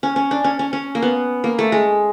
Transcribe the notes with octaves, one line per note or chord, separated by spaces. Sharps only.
C#4
C#4
D4
C#4
C#4
C#4
A#3
B3
A#3
A3
G#3